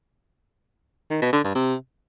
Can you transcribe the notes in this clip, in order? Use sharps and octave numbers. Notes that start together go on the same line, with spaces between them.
D#3
B2
D3
G2
C3